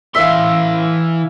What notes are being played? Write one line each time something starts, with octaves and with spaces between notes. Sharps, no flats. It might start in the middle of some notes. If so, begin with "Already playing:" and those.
E3 E5 F5 C6